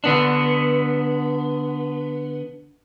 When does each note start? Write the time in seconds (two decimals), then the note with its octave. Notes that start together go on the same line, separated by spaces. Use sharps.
0.04 D3 B3 D4